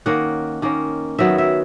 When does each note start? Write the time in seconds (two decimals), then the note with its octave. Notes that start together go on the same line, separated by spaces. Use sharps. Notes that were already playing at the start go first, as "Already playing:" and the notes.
0.06 D#3 A#3 C#4 F#5
0.62 D#3 A#3 C#4
1.18 D#3 F#3 B3 E5
1.38 E5